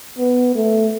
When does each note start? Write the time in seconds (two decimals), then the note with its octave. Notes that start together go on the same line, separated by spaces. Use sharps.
0.19 B3
0.55 A3